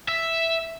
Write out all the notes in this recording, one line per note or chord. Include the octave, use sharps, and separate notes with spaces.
E5